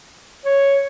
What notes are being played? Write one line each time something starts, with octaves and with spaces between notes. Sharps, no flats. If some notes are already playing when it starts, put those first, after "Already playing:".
C#5